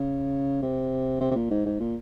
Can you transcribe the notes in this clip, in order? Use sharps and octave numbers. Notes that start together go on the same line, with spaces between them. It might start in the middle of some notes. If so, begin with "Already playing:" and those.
Already playing: C#3
C3
C3
C3
A#2
G#2
G#2
A#2